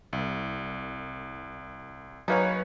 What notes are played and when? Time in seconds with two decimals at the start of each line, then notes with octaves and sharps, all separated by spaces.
0.13 C2
2.28 C#3 F#3 A#3 D#4 B4 C#5